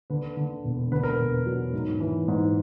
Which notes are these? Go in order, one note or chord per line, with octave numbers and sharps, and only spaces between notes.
D3 B4
D3
E1
D3 B4
A#4
E1 B4
F#3
G#2
E3
G#2